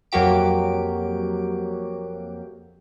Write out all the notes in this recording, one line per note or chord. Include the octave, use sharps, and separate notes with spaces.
F2 F#3 A#3 F#4 G4 D7